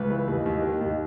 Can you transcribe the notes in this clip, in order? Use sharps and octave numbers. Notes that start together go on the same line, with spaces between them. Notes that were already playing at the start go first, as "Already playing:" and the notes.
Already playing: C#2 B4
E3
D#2
D#2
D#3
D#2